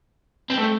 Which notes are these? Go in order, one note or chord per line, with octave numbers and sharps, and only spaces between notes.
C4
A3